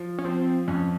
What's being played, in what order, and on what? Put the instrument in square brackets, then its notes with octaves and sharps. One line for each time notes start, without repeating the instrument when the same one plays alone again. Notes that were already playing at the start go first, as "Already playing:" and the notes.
Already playing: [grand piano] F3
[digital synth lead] C#4
[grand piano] F3 [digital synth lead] C4
[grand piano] F2 [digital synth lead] C#4